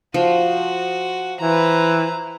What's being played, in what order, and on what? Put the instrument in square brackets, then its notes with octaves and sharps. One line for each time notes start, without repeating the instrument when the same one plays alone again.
[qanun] F3 [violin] F#4
[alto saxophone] E3 [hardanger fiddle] B4 C5 [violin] A#5